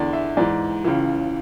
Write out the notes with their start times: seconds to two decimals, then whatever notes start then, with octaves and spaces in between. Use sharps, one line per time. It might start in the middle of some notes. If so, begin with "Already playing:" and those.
Already playing: E2 D3 D5
0.13 E5
0.37 G#2 E3 D5
0.84 C#2 C#3 E3